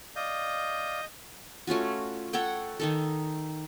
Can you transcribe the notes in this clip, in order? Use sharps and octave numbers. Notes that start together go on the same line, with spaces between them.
D5 D#5 F5 D#6 G6
A3 C#4 F4 F#4
A4 C#5 F#5 G5
D#3 D#4 A4